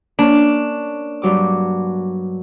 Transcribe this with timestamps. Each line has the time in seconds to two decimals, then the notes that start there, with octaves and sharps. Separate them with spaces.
0.19 A#3 C#4 D4
1.22 G2 F#3 D6